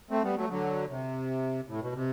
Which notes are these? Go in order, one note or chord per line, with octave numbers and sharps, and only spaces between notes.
A3 C4
G3 B3
F#3 A3
D3 F#3
C3
A2
B2
C3